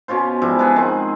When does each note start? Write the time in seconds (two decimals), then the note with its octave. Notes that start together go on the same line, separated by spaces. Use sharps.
0.08 B2 C#4 F4 C5
0.42 G#2 F3 G3 E4
0.59 G#3 B3 G#4
0.76 D#3 G#3 C4